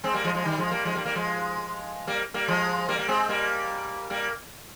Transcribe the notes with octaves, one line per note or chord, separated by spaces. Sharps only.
G#3 C4
G3 A#3
F3 G#3
F3 G#3
D#3 G3
F3 G#3
G3 A#3
F3 G#3
G3 A#3
G3 A#3
F3 G#3
G3 A#3
G3 A#3
F3 G#3
G3 A#3
A#3
G#3 C4
G3 A#3
G3 A#3